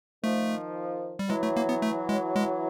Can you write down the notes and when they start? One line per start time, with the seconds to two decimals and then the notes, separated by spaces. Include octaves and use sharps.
0.24 D#3 F3 A3
1.19 G3
1.29 E3 F#3 G#3
1.43 A3
1.56 A#3
1.69 B3
1.82 A3
2.09 G#3
2.36 G#3